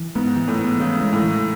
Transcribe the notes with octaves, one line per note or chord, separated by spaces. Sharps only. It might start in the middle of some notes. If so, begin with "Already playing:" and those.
Already playing: E3
G#2 B3
E3
A2
B3
C#3 E3
G#3
A2
E3